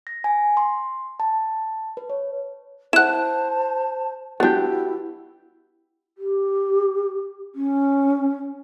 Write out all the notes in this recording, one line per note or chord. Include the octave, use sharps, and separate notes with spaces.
A#6
G#5
C6
A5
B4
C#5
E4 C5 F#5 A5 F#6 E7
B3 D4 E4 F#4 G4
G4
C#4